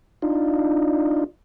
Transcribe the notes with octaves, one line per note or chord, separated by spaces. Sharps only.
D4 D#4 F4